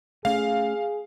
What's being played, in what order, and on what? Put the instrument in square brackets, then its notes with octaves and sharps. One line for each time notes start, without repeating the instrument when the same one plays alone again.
[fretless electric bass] A3 C#4 [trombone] G#4 [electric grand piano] F5